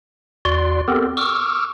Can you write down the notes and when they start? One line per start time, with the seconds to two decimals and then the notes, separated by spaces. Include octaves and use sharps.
0.45 E2 F#4 D5 C6
0.88 B3 C4 G4 A4 A#4
1.17 C#6 D6 E6 F6